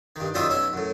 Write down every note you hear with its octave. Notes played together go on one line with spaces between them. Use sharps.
G2 D#3
F#2 D#3 G3 F4 E5 D#6
B1 C#4 E5
F#2 A2